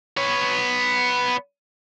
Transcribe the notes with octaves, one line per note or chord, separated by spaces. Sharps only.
B3 C#5